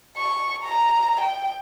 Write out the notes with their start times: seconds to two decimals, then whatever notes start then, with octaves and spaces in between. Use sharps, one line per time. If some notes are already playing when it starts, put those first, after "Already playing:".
0.17 C#6
0.63 A#5
1.21 G5